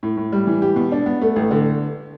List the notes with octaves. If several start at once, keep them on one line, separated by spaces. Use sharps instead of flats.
A2
A2
G3
E3
G4
B2
D4
B3
A3
A1
D3